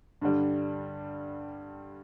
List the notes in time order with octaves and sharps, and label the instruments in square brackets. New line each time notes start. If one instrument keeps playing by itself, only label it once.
[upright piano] G2 D3 G3